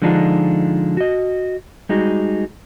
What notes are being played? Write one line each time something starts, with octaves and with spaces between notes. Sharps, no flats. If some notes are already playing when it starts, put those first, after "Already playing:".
D3 F3 G#3 D4 D#4 F4
F#4 D#5
G3 G#3 D#4 F#4